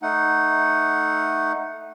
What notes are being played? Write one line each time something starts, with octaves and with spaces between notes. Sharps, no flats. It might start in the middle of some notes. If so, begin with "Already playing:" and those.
A3 D#4 F#5